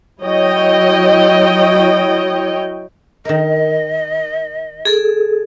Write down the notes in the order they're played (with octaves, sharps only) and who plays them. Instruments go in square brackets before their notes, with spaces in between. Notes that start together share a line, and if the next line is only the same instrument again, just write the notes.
[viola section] F#3 E4 C#5 D#5 G5
[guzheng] D#3 A#4 [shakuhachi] D#5
[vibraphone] G#4 A4